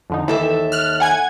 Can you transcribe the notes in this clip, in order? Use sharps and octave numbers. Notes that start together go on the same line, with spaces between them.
F2 D3 D#4
D#2 E3 A4 E5
F6 F#6
F#5 G#5 G#6